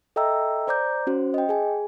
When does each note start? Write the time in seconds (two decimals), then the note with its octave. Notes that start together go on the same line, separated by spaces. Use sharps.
0.16 A4 D#5 E5 G5 A#5 E6
0.67 C5 D5 A#5 D6 G6
1.07 C#4 F#4 C5
1.34 D#5 G5
1.49 G#4 G#5